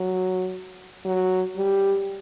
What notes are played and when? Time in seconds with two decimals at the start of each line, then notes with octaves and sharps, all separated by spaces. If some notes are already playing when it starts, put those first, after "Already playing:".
Already playing: F#3
1.05 F#3
1.56 G3